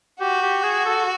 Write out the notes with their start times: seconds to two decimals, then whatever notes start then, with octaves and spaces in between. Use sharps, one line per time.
0.20 F#4 G4
0.42 G4
0.63 G#4
0.85 A4